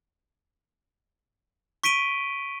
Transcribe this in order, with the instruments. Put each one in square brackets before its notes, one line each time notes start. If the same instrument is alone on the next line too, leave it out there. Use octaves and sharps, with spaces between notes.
[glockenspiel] C#6 B6 D7 D#7 G7